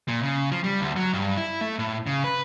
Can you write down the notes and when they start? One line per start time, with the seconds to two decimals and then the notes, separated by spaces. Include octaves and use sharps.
0.08 A#2
0.23 C#3
0.52 F3
0.64 G3
0.81 D2
0.97 F#3
1.14 G2
1.37 E4
1.61 A3
1.79 A2
2.07 C#3
2.24 B4